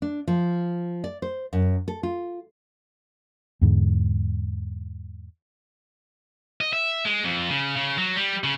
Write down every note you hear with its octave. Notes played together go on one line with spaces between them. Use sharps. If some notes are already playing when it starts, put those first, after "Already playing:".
D4
F3
D5
C5
F#2
A4
F4
E2 G#2 D3
D#5
E5
G#3
F2
C#3
C#3
F#3
G3
C#3